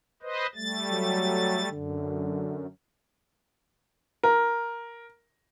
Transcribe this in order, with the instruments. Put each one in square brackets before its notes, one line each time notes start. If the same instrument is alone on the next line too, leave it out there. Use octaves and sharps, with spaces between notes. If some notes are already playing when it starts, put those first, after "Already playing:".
[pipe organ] B4 C5 D#5
G3 A3 A6
[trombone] F#3
[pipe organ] F#2 [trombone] D3
[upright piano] A#4